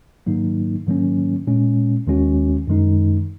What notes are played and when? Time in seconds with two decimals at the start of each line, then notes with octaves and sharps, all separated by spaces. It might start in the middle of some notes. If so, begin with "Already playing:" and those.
0.26 G#2 D#3 F#3 A#3 D#4
0.86 G#2 D#3 F#3 A#3 C#4
1.47 A#2 G#3 C#4
2.07 D#2 D#3 G#3 C#4 F#4
2.67 F#2 D#3 G#3 D#4